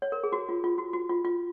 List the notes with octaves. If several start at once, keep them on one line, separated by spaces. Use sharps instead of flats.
C#5
A#4
G#4
F#4
F4
F4
F#4
F#4
F4
F4